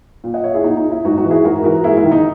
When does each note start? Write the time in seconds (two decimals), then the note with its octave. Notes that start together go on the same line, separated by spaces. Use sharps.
0.24 A#2
0.34 D#5 F#5
0.44 C#5 E5
0.54 E4 G#4
0.64 A#2 D#4
0.77 D#4
0.91 E4
1.05 G#2 D#4 F#4
1.17 D#4 F#4
1.24 E3
1.30 E4 G#4
1.44 G#2 F#4 A#4
1.64 E3 F#4 A#4
1.84 G#2 E4 G#4
1.97 E4
2.04 D#3
2.11 D#4